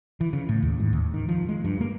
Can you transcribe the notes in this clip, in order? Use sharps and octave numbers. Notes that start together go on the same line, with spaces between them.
E3
C#3
A2
D#2
G#2
D#2
D#3
F3
G#3
G2
A#3